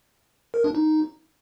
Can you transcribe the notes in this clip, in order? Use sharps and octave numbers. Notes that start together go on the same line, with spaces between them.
A#4
D4
D#4